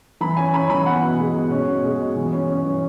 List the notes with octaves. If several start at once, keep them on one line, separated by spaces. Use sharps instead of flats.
E3 B5
C#4 G#5
C#4 B5
E3 B5
B3 F#5
B2
G#3
B2
C#4
B2
G#3
B2
E3
C#4
C#4
E3